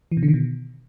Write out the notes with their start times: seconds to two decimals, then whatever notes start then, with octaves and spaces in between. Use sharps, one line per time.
0.12 E3
0.17 B2
0.23 D3
0.28 D#3
0.34 B2